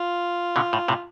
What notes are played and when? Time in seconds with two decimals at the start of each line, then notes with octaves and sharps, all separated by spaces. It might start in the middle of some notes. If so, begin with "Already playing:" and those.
Already playing: F4
0.56 B2 D3
0.73 A2
0.88 A2 C3